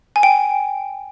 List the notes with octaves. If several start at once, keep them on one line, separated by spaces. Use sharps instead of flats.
G#5
G5